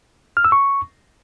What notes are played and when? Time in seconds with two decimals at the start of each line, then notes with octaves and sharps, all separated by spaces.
0.37 F6
0.44 E6
0.52 C#6